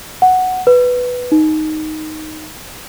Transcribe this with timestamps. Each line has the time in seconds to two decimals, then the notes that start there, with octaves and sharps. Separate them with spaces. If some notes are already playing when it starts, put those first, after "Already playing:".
0.22 F#5
0.67 B4
1.32 D#4